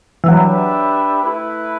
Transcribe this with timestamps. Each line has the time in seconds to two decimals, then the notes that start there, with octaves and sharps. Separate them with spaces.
0.24 E3
0.28 F#3 D4 G4 B4 E5
1.21 A3 E4 B4